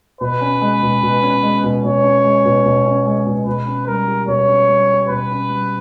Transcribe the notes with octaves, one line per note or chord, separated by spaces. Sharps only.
B2 B4
C#4
G#3
B2
B2
C#4
G#3
B2
B2 C#5
C#4
G#3
B2
B2
C#4
G#3
B2
B2 B4
C#4
G3 A#4
G4
B2 C#5
C#4
G3
G4
B2 B4
C#4
G3